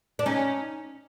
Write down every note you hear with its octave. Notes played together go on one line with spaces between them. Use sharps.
D4
C#4 D#4